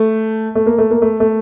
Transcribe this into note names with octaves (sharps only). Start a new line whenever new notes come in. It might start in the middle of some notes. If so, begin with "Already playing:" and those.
Already playing: A3
A3
A#3
A3
A#3
A3
A3